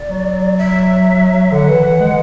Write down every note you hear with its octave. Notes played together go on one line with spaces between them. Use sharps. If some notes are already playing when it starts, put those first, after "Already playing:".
Already playing: D5
F#3
E5
D3 F#5
E3
E3
G#3